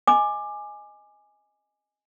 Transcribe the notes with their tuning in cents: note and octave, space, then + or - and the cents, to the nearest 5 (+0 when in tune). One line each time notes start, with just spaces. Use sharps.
D#5 +0 G#5 +0 D6 +20